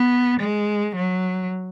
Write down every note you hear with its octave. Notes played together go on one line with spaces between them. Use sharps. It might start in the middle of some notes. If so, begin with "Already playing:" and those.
Already playing: B3
G#3
F#3